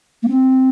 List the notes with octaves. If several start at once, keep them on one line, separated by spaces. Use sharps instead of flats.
A#3
C4